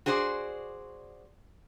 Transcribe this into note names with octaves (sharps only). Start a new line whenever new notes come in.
F#4 G#4 C5 D5